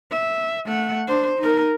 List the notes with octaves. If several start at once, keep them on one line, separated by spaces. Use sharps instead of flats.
E5
A3 F#5
D4 C5
D#4 A#4